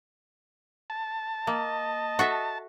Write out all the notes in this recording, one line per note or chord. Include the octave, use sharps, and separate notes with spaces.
A5
A#3 D#5
F#4 A4 E5